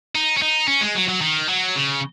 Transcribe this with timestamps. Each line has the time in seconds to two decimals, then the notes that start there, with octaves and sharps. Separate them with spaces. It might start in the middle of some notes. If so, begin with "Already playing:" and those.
0.15 D#4
0.37 C#4
0.42 D#4
0.68 C#4
0.81 G#3
0.95 F#3
1.09 F#3
1.21 D#3
1.49 F#3
1.76 C#3